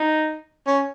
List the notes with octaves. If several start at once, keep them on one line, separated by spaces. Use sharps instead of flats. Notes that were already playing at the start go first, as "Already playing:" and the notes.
Already playing: D#4
C#4